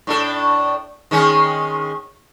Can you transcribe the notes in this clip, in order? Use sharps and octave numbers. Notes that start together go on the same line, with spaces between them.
A2 D4 A4
D#3 G#3 C#4